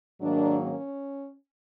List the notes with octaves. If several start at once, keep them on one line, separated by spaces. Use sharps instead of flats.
G#2 D#3 F#3 A#3 D4
C#4